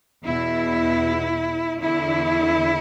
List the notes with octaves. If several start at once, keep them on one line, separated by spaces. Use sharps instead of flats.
E2 B2 E4
E2 D3 E4